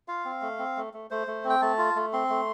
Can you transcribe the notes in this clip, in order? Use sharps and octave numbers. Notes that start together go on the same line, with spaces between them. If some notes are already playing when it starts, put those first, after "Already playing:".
F4 F5
C4
A3
C4
A3
A3
A3 C5
A3
C4
G5
A3 A5
F4
A3
C4 C6
A3